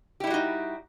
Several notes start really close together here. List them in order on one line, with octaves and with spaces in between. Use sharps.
G4 E4 G3 F#4 D#4